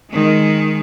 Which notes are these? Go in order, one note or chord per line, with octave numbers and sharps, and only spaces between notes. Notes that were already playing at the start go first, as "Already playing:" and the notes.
D#3 G#3